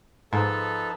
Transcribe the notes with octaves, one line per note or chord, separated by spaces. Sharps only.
G#2 F3 D#4 A4 B4